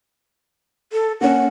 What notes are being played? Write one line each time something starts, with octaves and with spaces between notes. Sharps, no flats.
A4
A#3 C#4 F#5